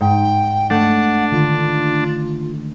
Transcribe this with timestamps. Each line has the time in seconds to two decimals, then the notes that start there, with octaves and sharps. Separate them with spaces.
0.01 G#2 G5
0.70 A3 D4 F#5
1.32 D3 D#3 F4